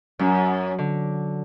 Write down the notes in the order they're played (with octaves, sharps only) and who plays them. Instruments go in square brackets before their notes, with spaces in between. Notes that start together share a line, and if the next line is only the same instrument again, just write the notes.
[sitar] F#2 [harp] F#3
[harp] D3